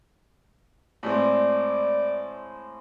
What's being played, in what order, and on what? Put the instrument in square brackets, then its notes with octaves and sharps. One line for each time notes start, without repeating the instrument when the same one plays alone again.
[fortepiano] A2 G#3 C4 [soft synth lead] D5